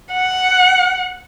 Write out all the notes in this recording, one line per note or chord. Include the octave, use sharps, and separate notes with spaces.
F#5